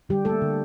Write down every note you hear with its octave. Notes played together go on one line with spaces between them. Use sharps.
D3 G3 G4
G3 A3 A#3 A4
D3